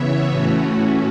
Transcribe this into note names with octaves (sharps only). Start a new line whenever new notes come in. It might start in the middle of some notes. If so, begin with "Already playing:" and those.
Already playing: C#3 E3 B3 C#5 E5
A2 E3 A3 C#4 F#4